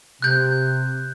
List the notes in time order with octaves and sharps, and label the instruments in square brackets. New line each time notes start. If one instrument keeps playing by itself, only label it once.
[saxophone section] C3 [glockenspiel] F#6 G6